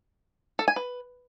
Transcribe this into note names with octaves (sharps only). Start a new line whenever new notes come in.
A4
G#5
B4